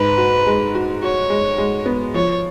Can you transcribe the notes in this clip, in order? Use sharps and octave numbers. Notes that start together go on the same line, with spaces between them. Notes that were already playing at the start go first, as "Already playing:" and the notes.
Already playing: G#2 B4
F#4
G#3
F#4
F#4 C#5
G#3
G#3
B3
F3 C#5